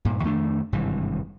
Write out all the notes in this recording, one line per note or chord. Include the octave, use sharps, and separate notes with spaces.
G2 A#2
F2 D#3 A3 D4
G#1 G2 C3 E3